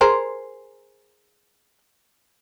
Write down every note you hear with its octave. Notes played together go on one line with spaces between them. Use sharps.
G#4 A#4 C5